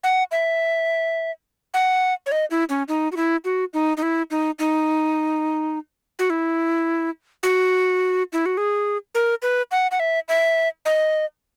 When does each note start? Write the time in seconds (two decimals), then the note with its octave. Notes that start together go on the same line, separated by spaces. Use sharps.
0.04 F#5
0.32 E5
1.74 F#5
2.26 C#5
2.32 D#5
2.51 E4
2.70 C#4
2.88 D#4
3.12 F#4
3.17 E4
3.45 F#4
3.74 D#4
3.97 D#4
4.02 E4
4.31 D#4
4.59 D#4
6.19 F#4
6.30 E4
7.43 F#4
8.33 E4
8.46 F#4
8.57 G#4
9.15 A#4
9.42 B4
9.71 F#5
9.91 F#5
10.00 E5
10.29 E5
10.85 D#5